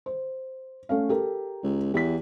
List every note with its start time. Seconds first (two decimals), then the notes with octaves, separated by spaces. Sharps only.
0.06 C5
0.89 A3 C#4 F5
1.09 G4 A4 A#4
1.63 C#2
1.94 E2 G4 B6